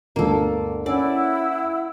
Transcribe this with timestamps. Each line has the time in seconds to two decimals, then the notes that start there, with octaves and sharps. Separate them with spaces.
0.16 G1 D2 A#3 A4
0.86 C#4 E4 D5 F#5 E6